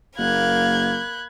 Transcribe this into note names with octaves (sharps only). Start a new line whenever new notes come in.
F#1 A#3 F5 B5 F#6 G#6